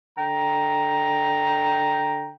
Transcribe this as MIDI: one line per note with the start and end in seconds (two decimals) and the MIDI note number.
0.18 2.31 50
0.18 2.31 79
0.18 2.31 82